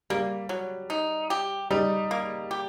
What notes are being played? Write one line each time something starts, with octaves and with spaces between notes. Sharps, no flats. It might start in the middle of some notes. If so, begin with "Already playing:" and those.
G3 A#3
F#3
D#4
G4
G3 D#4
A#3
G4